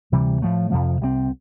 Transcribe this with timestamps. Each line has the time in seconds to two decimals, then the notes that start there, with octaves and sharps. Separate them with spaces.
0.12 D2 C3 E3 G3
0.42 A2 F3 A3
0.71 F2 C3 F3
1.01 C2 C3 G3 C4